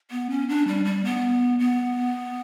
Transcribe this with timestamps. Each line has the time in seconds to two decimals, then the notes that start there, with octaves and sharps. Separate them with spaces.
0.11 B3
0.30 C#4
0.49 D4
0.68 G3
0.85 G3
1.05 B3
1.59 B3